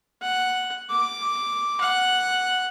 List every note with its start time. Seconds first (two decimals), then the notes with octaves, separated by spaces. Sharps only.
0.22 F#5
0.90 D6
1.81 F#5